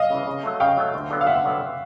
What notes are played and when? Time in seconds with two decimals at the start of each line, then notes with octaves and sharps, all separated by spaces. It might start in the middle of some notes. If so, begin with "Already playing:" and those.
Already playing: D#5 F5
0.10 C#3 E3
0.27 C#3
0.43 F#3 A3
0.60 C#3 F5 G5
0.77 F#3 A3
0.94 D2
1.10 D3 F#3 B3
1.21 F5
1.26 D2 E5 F#5
1.44 D3 F#3 B3